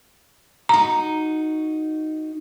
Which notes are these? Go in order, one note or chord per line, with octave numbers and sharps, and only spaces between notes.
D#4 F#4 A#5